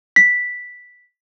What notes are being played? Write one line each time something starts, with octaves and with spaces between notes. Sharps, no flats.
B6